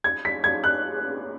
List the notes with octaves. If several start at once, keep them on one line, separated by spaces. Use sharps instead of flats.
G#6
B6
G#6
F#6